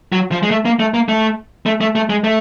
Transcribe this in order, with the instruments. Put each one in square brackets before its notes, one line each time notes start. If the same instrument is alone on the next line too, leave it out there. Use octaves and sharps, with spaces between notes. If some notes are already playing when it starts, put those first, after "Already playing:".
[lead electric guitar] F#3
F3
G#3
A3
A#3
A3
A#3
A3
A3
A3
A3
G#3
A3